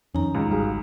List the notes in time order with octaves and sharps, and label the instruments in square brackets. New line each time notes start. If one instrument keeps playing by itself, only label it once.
[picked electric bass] F2 [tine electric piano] D#3 C#4 [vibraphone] D#4 A#5
[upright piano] C#2
[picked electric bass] G#1 G3 [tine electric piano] F#4 G#4 F5